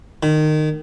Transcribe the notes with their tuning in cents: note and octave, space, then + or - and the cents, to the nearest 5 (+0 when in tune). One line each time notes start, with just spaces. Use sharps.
D#3 -20